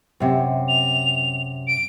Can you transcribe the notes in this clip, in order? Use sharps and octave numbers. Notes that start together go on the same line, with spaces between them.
F#2 C3
F7
D7